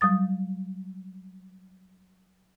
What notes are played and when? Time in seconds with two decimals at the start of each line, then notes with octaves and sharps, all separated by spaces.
0.01 F#3 G3 D#6 A6